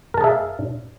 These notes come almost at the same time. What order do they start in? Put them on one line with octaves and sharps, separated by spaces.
A#4 A5 G#4 E5 F5